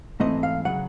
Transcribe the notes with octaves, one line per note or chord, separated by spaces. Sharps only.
G#2 E3 A3 C4 D#5
F5
C#3 F#3 F#5